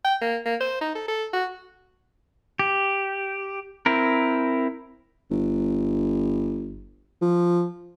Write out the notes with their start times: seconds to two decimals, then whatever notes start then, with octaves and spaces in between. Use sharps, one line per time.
0.05 G5
0.21 A#3
0.46 A#3
0.61 C5
0.81 D#4
0.95 A4
1.08 A4
1.33 F#4
2.59 G4
3.86 C4 E4 A#4
5.31 G1
7.22 F3